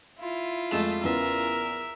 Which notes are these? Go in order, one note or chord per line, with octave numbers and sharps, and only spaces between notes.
E4 F4
F2 G#3 A3 E7
E2 C#3 B3 A#4 E5